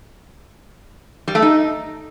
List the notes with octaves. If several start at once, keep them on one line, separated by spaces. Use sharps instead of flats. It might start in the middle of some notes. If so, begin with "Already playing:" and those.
G3
A3
D#4